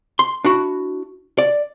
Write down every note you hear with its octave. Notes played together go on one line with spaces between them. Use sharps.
C6
D4 E4 F#4
D5